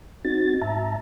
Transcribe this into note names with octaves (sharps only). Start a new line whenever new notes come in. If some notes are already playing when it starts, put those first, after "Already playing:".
C4 D#4 F#4 A6
G#2 E5 A5 A#5